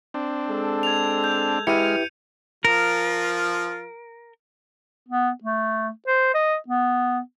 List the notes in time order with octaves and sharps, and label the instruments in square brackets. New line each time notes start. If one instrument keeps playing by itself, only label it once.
[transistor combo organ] C4 D4
[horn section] G#3 A4
[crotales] G#6 F7
G6
[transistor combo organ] G#3 F6 [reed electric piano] E4 G4 B4 [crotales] C#7 D#7
[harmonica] F3 F4 [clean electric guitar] A#4
[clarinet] B3
A3
C5
D#5
B3